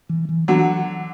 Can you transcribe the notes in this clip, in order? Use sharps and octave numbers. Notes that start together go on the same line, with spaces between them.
E3
E3
D3 E3 F#3